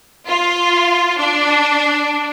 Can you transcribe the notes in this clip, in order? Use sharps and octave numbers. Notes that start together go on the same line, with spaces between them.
F4
D4